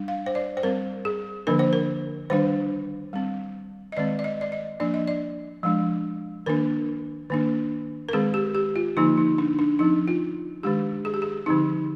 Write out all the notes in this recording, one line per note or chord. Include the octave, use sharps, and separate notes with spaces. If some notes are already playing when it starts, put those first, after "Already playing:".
Already playing: G3 D4
F5
C5
D5
C5
G3 C4 A#4
G#4
D3 F3 A#3 D4 A#4
C5
A#4
D#3 G3 D4 C5
G3 C4
D#5
D#3 G#3 C4 D5
D5
D#5
D5
D#5
F3 A#3 D4 D5
D#5
D5
F3 G#3 D4
D#3 A#3 D4 A#4
D#3 A#3 D4
A#4
D#3 G#3 C4 G#4
G4
G4
F4
D3 F3 A#3 D#4
D#4
D4
D4
F3 C4 D#4
F4
D#3 G#3 D4 G4
G#4
G4
G#4
D3 F3 C4 D#4